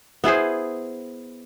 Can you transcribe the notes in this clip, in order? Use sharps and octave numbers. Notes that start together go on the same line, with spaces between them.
B3 E4 G#4 C5